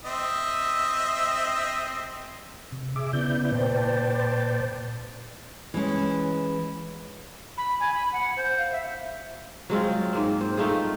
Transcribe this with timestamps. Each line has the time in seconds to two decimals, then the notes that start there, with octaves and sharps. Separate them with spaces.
0.05 C4 D#5 E5
2.72 C3
2.96 G#4 E5 D6
3.13 C#3 B3 E4 D5 G6
3.52 A#2 B4 C5 D5 G5 A5
5.74 E3 G#3 C#4
7.57 B5
7.80 G#5
7.94 B5
8.12 F#5
8.36 C5
8.58 F5
8.72 E5
9.70 F#3 G#3 C4 F4
10.13 G#2 A#3 C4
10.41 C5
10.57 A3 D#4 F4 G#4